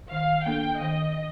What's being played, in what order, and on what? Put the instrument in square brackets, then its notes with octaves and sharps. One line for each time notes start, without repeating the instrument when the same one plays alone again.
[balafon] D#3 [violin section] F5
[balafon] A#3 D4 A4 [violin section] G5
[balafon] D#3 [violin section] D#5